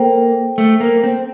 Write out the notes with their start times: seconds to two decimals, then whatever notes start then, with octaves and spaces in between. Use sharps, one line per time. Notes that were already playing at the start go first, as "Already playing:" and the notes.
Already playing: A#3 A4 C5 G5
0.58 A3
0.80 A#3
1.04 C4